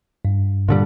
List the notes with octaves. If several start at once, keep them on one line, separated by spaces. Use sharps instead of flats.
G2
A#2 D3 G3